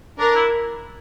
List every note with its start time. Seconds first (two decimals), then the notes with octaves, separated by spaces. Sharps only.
0.18 D4 A#4
0.35 E4